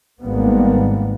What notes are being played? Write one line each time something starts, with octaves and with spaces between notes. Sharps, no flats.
G#1 G#2 G3 A#3 B3